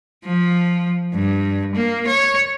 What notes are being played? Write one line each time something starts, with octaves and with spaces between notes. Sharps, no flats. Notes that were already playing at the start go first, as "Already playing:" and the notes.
F3
G2
A#3
C#5